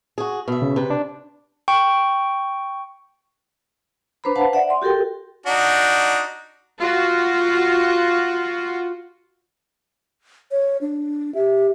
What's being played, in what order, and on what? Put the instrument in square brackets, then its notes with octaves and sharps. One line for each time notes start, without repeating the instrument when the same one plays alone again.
[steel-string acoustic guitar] F#4 G#4
B2 E5
[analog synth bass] C#3
[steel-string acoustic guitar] C3 B4
[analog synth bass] D4
[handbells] G5 C#6
[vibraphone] D4 B4 C5 A#5 B5
B4 C5 F5 F#5 A5
D5 E5 F#5
C6
F#4 G4 A4 A#4 G5
[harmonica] D4 D#4 F#4
[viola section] F4 F#4
[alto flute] C#5
D4
[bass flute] G4 [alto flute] E5